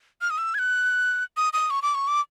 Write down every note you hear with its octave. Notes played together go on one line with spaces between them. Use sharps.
F6
D#6
E6
G#6
F#6
D#6
D#6
C#6
D6
C#6
D6